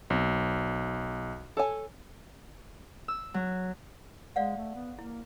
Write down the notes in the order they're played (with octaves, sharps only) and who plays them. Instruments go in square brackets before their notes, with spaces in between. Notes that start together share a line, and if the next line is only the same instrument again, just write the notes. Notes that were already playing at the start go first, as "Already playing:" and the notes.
[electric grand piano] B1 [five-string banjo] C4
[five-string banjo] A4 C#5 G#5
[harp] E6
F#3
[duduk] G#3 [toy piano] D5 F5 F#5
[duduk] A3
B3
[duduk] A#3 [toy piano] E4